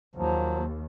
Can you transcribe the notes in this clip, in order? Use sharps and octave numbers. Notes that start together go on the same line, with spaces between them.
D#2 F3 F#3